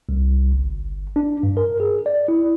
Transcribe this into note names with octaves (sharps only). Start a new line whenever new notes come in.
C2
G1
D4
G2
A#4
G#4
D5
E4